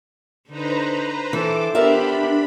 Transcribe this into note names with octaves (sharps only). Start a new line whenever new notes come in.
D3 D#4 B4 C5 A#5
E3 A4 C5 D6
B3 D4 G4 A#4 C5 D5 E5 B5